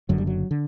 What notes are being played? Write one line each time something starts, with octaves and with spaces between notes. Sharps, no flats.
F#1 F#2 D3 F#3
G3
F#3
D3